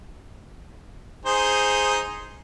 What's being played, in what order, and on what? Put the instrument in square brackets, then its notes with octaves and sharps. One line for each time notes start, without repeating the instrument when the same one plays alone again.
[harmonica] D#4 G#4 C5